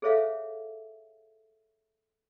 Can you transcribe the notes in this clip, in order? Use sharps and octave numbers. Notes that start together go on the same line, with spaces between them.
G#4 A4 C5 C#5 E5 F5